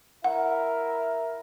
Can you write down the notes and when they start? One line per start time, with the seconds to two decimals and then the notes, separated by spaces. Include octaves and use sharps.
0.24 E4 A#4 E5 F#5